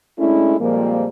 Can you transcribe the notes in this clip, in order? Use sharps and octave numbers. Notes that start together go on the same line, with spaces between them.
G#3 A3 C#4 D4 E4
F2 A#2 F3 G3 G#3 A#3